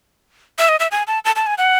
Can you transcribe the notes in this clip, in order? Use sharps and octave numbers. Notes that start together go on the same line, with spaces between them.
E5
D#5
E5
G#5
A5
A5
A5
G#5
F#5